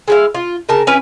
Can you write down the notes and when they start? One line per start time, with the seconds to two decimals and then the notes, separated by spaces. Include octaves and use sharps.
0.08 G#3 E4 F5
0.34 F4
0.69 C#3 A#4 A5
0.87 C#4 E4 B4 G#5